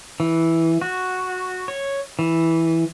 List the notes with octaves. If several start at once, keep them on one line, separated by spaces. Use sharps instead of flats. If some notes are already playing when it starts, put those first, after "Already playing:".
E3
F#4
C#5
E3